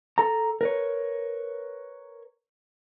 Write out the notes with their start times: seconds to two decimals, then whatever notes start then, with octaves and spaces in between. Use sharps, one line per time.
0.18 A4 A#5
0.61 A#4 B4 C#5